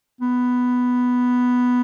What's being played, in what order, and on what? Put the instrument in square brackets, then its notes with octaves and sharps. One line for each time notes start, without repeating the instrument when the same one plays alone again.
[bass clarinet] B3